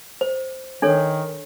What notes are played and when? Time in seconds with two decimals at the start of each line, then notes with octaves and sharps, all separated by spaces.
0.21 C5
0.82 D#3 D4 A4 C#5